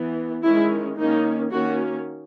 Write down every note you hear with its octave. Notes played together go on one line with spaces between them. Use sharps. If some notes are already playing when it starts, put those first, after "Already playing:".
Already playing: E3 B3
D#3 G#3 C#4 E4
D#3 A#3 C#4 D#4
D#3 A#3 C#4 F#4